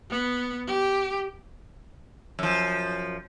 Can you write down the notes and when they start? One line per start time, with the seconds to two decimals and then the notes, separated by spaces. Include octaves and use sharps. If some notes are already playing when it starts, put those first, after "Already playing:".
0.10 B3
0.68 G4
2.39 F#2 F3